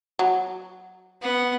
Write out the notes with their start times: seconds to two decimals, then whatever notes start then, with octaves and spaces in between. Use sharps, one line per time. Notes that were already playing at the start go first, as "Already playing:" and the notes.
0.19 F#3
1.22 B3 F#5